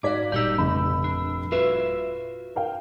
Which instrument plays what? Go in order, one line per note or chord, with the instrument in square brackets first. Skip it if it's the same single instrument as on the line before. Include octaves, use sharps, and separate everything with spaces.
[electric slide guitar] G#2 F#4 [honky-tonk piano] D#4 D5 F5 [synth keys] D6 G#6 B6
[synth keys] G1 A#2 E6 [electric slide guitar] D#4 G4 D5 [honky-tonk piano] G6
[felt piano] F1 [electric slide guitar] C#3 [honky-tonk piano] B5
[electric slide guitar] D4
[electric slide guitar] F4 F#4 E5 [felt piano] B4
[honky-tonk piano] A#4 F5 G5